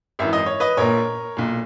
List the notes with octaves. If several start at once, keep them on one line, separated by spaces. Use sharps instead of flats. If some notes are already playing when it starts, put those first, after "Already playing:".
G#1 F#2 E3 E5
D#5
C#5
B4 D#5
A#1 A#2 A#4 C#5
B1 A#2